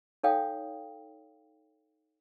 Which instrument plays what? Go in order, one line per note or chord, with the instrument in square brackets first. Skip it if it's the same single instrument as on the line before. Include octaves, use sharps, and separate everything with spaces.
[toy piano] D#4 A4 C#5 F5 G5 D#6